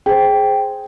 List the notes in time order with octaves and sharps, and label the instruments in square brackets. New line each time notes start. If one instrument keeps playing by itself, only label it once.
[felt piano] G#4 C5 [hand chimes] G5